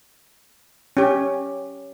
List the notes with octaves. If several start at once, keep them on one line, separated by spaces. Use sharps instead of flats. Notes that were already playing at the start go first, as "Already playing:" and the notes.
C#4 G4